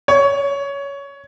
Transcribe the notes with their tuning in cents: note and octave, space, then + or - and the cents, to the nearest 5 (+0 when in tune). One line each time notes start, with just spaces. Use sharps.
C#5 +15